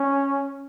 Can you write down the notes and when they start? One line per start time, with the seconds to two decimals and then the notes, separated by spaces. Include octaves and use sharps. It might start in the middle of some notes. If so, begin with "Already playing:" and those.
Already playing: C#4